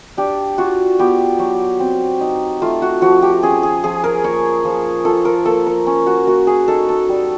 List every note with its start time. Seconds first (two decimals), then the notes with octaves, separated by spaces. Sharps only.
0.17 D4 G4
0.58 F4 F#4
0.99 B3 G4
1.39 F#3
1.80 C4
2.21 D#4
2.62 A3 F4
2.82 F#4
3.02 F3 F#4
3.22 G4
3.42 C#4 G#4
3.63 G#4
3.83 F3 G#4
4.04 A#4
4.24 A#3 C#5
4.65 F3
5.05 F4 A4
5.25 A#4
5.45 A#3 A4
5.66 A#4
5.87 C#4
6.06 F#4
6.27 A#3 F#4
6.47 G#4
6.68 D#4 A4
6.89 A4
7.09 G3